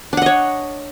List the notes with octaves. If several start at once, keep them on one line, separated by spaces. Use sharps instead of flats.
D4 C#5 D#5 F#5